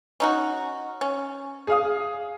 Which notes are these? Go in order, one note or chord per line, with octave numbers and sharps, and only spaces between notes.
C#4 D#4 F#4
C#4
G#4 F5 D#6